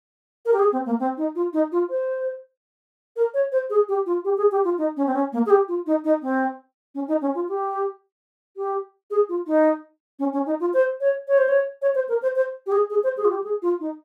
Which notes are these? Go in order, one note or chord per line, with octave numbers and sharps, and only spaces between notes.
A#4
G4
G#4
C4
A#3
C4
D#4
F4
D#4
F4
C5
A#4
C#5
C5
G#4
G4
F4
G4
G#4
G4
F4
D#4
C#4
C4
C#4
A#3
G#4
G4
F4
D#4
D#4
C4
C#4
D#4
C#4
F4
G4
G4
G#4
F4
D#4
C#4
C#4
D#4
F4
C5
C#5
C#5
C5
C#5
C#5
C5
A#4
C5
C5
G4
G#4
G#4
C5
G#4
F4
G4
G#4
F4
D#4